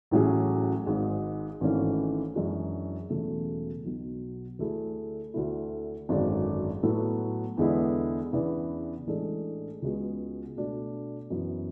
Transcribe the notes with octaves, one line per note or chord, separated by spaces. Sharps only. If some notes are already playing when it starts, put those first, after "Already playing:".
A1 A2 F#3 C#4 G#4
G#1 G#2 G#3
G#1 G#2 E3 A3 C#4
F#2 E3 G#3 D4 F#4
E1 E2 C#3 F#3 A3
B1 B2 F#3
D2 D3 A3 E4 G#4
D2 D3 A3 E4
G#1 F#2 D3 G#3 D4
A2 F#3 B3 F#4 A4
E2 D3 G#3 B3 E4
E2 C#3 E3 B3 D4
A1 A2 G#3 D4 A4
C#2 C#3 G#3 B3 F#4
B2 A3 D4 F#4
F#2 E3 B3